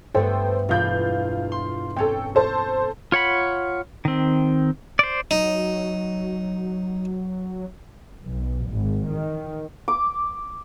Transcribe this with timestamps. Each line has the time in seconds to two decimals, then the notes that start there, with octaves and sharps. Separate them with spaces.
0.15 G2 A3 B3 A4 C5 G5
0.69 E1 D4 F4 F5 B5 G6
1.52 C6
1.96 C4 C#4 A4 G5
2.35 A4 C5 A5
3.12 F4 C#5 F#5 B5
4.05 D#3 C4
4.99 C5 D5
5.31 F#3 D#4
8.25 B1
8.71 G#1
9.11 D#3
9.88 D6